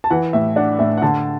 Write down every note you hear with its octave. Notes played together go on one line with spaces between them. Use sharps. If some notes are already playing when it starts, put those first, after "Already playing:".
A5
E3 F#5
A2 E5
D4 F#5
A2 E5
F#5
D3 A5